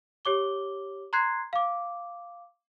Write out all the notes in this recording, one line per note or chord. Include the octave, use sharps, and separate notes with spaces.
G4 C#5 D6 G7
A#5 C6 F#6 G#6 C7
F5 D6